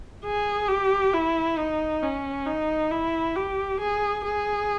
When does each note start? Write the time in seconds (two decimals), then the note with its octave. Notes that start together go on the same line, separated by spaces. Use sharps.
0.25 G#4
0.68 G4
1.14 E4
1.58 D#4
2.03 C#4
2.47 D#4
2.91 E4
3.36 G4
3.81 G#4
4.25 G#4